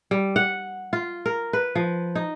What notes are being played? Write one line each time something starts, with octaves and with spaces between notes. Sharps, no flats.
G3
F#5
F4
A#4
B4
F3
D#4